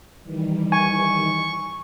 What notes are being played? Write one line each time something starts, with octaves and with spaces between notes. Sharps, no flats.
D#3 E3 G3
G#5 C#6